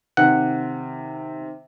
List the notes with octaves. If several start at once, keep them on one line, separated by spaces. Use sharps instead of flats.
C3 D#3 F#5